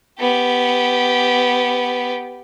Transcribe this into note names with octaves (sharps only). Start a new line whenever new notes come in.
B3 G4